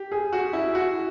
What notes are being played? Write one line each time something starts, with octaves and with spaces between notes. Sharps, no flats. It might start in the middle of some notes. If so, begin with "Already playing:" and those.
Already playing: G4
G#4
F#4
E4
F#4